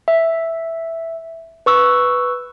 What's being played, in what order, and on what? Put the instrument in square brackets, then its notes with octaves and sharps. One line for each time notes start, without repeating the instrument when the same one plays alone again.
[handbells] E5
B4 C#6 E6